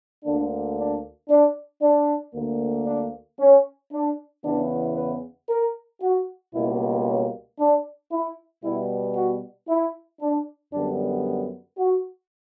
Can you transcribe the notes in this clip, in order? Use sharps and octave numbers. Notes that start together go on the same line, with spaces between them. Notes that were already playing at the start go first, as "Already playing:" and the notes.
D2 D3 A#3 D4
D4
D4
D4
D2 D3 A#3
D4
C#4
D4
E2 C#3 E3 B3 D4
B4
A#4
F#4
C#2 B2 G3 A#3 E4
C#4
D4
E4
B2 G3 B3 E4
F#4
E4
D4
F#2 D3 G3 B3 D4
F#4